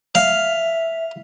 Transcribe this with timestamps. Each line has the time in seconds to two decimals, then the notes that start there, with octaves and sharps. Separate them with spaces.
0.15 E5 F5